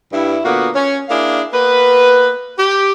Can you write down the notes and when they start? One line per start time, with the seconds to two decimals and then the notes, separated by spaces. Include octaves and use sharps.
0.12 G2 E4
0.45 A#2 D3 A#3 B3 F#4
0.75 C#4
1.09 A#3 D4 E4 G#4 F5
1.53 A#3 B3 B4
2.58 G4